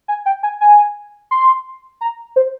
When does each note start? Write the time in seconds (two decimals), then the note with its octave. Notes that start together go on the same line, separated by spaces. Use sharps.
0.08 G#5
0.26 G5
0.43 G#5
0.61 G#5
1.31 C6
2.01 A#5
2.36 C5